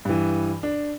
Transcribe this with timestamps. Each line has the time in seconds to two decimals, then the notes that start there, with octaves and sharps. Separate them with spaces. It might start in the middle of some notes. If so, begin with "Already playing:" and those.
0.05 G2 E3
0.63 D4